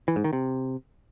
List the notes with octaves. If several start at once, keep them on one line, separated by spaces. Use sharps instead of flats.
E3
G#2
D#3
C3